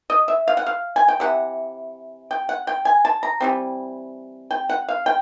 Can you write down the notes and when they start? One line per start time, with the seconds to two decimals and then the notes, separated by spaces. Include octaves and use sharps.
0.10 D#5
0.28 E5
0.48 F5
0.57 F#5
0.67 F5
0.96 G#5
1.08 G5
1.20 C3 E3 F#5
2.31 G5
2.49 F#5
2.67 G5
2.85 G#5
3.05 A5
3.23 A#5
3.40 E3 G3 C4
4.51 G5
4.69 F#5
4.89 F5
5.06 G5